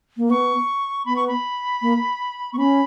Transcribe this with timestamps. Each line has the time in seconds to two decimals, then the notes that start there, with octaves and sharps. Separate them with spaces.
0.17 A#3
0.30 B3 C#6
1.06 B3 B5
1.16 C#6
1.28 B5
1.82 A#3
2.53 B3 C#6
2.58 C#4 B5